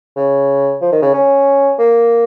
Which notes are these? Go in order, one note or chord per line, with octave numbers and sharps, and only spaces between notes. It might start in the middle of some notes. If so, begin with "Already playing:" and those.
C#3
F3
D#3
C#3
C#4
A#3